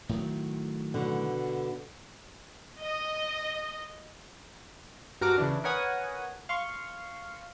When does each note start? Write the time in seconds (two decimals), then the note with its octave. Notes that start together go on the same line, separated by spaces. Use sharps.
0.09 A2 D#3 F#3
0.94 B2 D3
2.81 D#5
5.21 G2 F#4 A#4 D6
5.38 C#3 E3 D4
5.64 A#4 B4 C#5 F#5 G#5 D#6
6.49 F5 C6 C#6